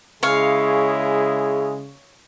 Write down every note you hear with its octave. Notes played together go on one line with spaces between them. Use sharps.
C#3 G#3 E4 G#4 C#5 F5